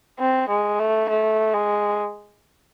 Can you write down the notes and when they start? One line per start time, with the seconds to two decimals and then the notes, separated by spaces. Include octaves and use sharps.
0.19 C4
0.49 G#3
0.79 A3
1.09 A3
1.53 G#3